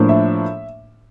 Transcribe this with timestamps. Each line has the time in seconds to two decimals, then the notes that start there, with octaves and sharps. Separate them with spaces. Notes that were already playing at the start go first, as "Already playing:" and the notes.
Already playing: A2 F3 A#3 D4
0.09 E5